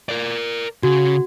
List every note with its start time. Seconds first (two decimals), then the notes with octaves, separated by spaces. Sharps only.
0.09 A#4 D5
0.83 C#3 F#4